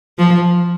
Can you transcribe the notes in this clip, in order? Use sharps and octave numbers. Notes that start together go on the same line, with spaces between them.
F3